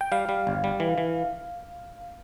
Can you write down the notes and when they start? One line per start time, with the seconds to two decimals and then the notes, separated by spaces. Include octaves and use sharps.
0.01 G5
0.12 G3 F5
0.29 G3
0.47 G1
0.64 G3
0.80 E3
0.98 E3